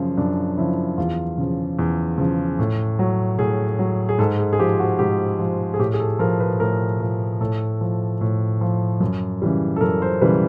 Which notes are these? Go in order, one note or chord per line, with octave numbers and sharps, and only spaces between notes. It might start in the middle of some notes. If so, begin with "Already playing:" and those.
Already playing: F#2 C#3 F3
F#2 D4
C#3 F3 E4
E2 F4
C#3 F3
E2
C#3 F3
A2
F#3
A2 G#4
F#3
G#4
G#2 A4
G#4
G#4
F3 G4
F#4
G#2 G4
F3
G#4
A2 G4
G#4
A4
F3 A#4
B4
A2 A#4
F3
A2 A4
F3
A2
F3
F#2
C#3 E3 G3
A4
F#2 A#4
C5
C#3 E3 G3 B4